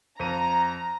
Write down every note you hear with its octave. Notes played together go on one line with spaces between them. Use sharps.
F2 A#5 D#7